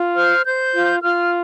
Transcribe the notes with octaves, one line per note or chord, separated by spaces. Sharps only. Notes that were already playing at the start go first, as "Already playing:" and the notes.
Already playing: F4
C5 F6
C5 G6
F4
F4 F6